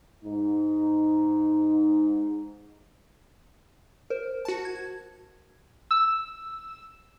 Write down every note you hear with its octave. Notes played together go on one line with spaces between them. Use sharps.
G#2 D#4
A#4 C5
F#4 A5
G#6
E6